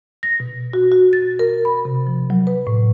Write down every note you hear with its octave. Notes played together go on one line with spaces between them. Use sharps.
A#6
B2
F#4
F#4
A6
A#4
B5
C3
F3
F#3
B4
A2